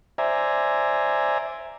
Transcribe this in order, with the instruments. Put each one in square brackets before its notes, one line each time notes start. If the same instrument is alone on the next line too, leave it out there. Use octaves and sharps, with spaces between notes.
[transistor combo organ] C5 D5 E5 G#5 A#5